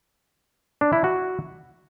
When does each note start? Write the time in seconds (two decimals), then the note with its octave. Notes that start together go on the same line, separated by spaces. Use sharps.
0.81 D4
0.93 E4
1.04 F#4